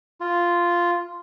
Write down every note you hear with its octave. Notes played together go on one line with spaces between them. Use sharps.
F4